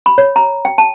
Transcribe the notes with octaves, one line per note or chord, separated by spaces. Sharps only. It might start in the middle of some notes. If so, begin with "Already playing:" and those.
B5
C#5
A#5
G5
A5